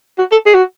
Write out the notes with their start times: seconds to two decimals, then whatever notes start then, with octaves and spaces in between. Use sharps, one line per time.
0.18 F#4
0.31 A4
0.46 G#4
0.54 F#4